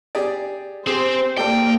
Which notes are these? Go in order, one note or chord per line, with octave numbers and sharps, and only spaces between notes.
G4 G#4 D5
C4 G4 G#4 C5
A#3 G4 A4 D5 G5